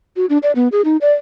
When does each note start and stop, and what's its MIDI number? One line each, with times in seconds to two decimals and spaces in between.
0.16 0.26 66
0.30 0.38 62
0.43 0.52 74
0.55 0.68 59
0.72 0.81 68
0.85 0.97 63
1.01 1.13 74